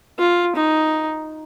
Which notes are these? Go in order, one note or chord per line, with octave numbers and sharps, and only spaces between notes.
F4
D#4